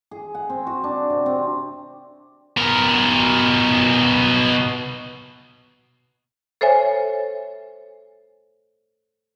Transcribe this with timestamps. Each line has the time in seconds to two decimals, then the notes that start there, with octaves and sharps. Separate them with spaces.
0.11 G#4
0.35 F#5
0.50 C4
0.67 F#4
0.84 D4
1.10 C3
1.26 C4
2.57 B2 A#4
6.61 A4 C5 C#5 E5 G#5